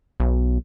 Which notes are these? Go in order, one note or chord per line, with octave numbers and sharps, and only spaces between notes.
B1